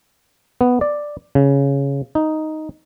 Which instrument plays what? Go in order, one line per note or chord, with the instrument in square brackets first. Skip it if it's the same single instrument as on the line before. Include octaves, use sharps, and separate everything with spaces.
[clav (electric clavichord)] B3
D5
C#3
D#4